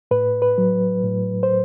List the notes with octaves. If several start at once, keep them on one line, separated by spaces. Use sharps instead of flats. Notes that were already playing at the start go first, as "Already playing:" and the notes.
A2 B4
B4
F#3
A2
C5